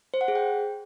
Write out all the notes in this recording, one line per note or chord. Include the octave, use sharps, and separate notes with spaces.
C5
F#5
G#4
G5